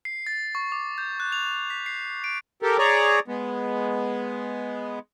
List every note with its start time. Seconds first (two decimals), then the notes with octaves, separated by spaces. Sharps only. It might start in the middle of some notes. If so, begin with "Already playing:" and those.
0.05 C7
0.27 A6
0.55 C#6
0.72 D6
0.98 G6
1.20 F#6
1.32 F7
1.70 B6
1.86 C7
2.24 D7
2.62 G4 A4 A#4
2.78 G#4 C#5 D5 A#5
3.28 G#3 B3